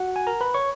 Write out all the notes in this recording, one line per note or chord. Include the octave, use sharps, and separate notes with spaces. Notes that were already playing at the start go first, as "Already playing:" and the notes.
Already playing: F#4 F#5
G#5
A#4 A#5
B4 B5
C#5 C#6